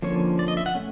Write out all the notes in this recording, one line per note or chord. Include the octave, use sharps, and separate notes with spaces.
D3 F3 A#3 C#4 C#5
D5
D#5
E5
F#5
A3 C#4